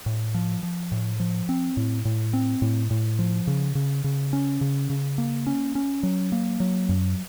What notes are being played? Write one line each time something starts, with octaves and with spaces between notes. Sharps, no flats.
A2
F3
F3
A2
F3
C4
A2
A2
C4
A2
A2
F3
C#3
C#3
C#3
C#4
C#3
C#3
A#3
C#4
C#4
F#3
A#3
F#3
F#2